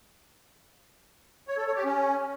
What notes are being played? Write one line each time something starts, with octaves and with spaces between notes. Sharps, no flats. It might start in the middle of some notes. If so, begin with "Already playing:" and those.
C#5
A4
C#5
G4
C#4